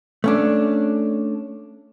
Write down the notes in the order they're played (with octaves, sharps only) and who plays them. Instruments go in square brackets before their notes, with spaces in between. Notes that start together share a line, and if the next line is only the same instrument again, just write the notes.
[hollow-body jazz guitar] A3 C#4 D4